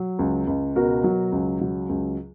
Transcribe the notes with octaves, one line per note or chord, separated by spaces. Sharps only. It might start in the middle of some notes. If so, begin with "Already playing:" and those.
Already playing: F#3
C#2
C#2
B2 F#4 A#4
F#3
C#2
F#3
C#2